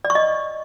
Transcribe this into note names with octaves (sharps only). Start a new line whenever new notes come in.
D5
C#6
D#5